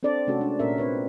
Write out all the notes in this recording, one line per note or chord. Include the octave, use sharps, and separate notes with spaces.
C4 D4 A4 D5
C3 A3 C#4 F#4 A4
G#3 D4
A#2 C#4 A#4 E5
C4 B4 C#5